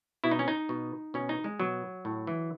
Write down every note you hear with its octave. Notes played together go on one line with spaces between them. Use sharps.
B2 E4
D#4
C#4
D#4
B2
B2 C#4
D#4
G#3
B2 F#3
A2
E3